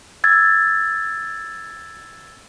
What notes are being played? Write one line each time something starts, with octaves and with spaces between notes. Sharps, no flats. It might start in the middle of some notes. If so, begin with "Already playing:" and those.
E6 G#6 A6